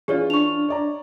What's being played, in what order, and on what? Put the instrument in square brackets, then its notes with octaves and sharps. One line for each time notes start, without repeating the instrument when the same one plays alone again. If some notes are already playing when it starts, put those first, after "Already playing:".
[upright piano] E3 C#4 F4 [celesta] G#4 C#5 D5
[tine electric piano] D4 [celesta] C#6 F7
[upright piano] C#5 D5 A#5